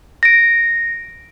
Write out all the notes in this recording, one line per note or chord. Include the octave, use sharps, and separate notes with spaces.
A#6 D7